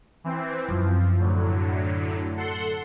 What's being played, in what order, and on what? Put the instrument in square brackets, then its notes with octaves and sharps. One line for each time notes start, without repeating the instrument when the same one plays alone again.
[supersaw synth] E3 C4
[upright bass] F#2 [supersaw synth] F3
[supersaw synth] A2 D3 F#3
A4 F#5 C6